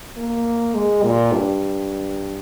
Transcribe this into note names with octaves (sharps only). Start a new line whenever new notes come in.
A#3
G#3
A#2
G2